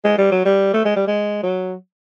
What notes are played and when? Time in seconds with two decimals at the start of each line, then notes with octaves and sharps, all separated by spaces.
0.04 G#3
0.18 G3
0.32 F#3
0.45 G3
0.74 A3
0.85 G#3
0.96 G3
1.07 G#3
1.43 F#3